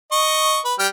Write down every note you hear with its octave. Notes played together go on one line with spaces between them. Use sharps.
D#5 C#6
B4
G3 G5 F6